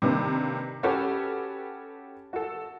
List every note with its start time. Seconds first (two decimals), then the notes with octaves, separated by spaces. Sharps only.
0.02 C3 D#3 A#3 D4 B4
0.83 C#4 F#4 G4 A4 B4 C#5
2.33 F#4 A4